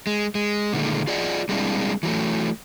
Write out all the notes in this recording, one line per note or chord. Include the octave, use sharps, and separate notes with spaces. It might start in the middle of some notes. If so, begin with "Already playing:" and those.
G#3
G#3
A#2 D3 D#3 G#3 A3
F4 G#4 D5 D#5 F#5
G3 G#3 A#3 C4 D4 E4
E3 F#3 A3